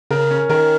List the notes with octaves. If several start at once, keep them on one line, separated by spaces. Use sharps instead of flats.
C#3 A#4
C#4
D#3 A#4